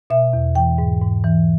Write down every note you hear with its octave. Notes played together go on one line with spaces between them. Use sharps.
B2 E5
E2
E3 G5
G#2
G#2
E3